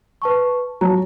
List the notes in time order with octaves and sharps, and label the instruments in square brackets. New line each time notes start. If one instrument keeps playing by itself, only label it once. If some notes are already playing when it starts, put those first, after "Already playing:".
[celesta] B4 A5 C#6
[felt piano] F#3 [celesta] A5 A#5